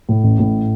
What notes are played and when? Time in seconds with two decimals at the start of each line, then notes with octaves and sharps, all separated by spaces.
0.09 A2
0.24 A1
0.39 A2